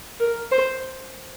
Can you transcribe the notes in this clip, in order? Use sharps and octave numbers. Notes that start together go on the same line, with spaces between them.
A#4
C5